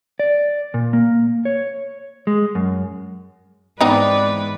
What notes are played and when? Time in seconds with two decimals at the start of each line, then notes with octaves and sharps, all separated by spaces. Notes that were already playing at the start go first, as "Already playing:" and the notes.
0.19 D5
0.74 A#2
0.93 A#3
1.45 C#5
2.27 G#3
2.55 F#2
3.81 G#2 E3 B3 C4 D#4 B4 D5